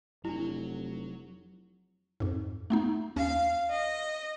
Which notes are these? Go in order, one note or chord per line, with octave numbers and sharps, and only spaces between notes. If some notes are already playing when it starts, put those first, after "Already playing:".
F1 F#3 D4 E4
F2 G#2
A3 B3 D#4
D#2 C#4 F5
D#5